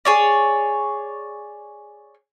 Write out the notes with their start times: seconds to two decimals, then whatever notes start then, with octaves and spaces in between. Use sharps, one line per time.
0.05 G#4 C#5 D5